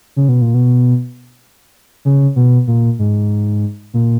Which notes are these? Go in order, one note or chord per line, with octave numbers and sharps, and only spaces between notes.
C#3
B2
A#2
B2
C#3
B2
A#2
G#2
A#2